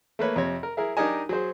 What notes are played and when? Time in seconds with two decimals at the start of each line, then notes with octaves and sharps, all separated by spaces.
0.19 A3 A#3 B4 C#5
0.36 F2 C3 C#5
0.63 A#4
0.77 E4 G#4 A#4
0.97 D4 D#4 G4 A#4 D#5 G#5
1.29 F#3 G#4 C5